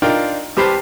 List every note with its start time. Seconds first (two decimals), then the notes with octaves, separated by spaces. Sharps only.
0.02 D4 D#4 F4 A#4 G5
0.57 C2 G4 B4 C5 A5 F6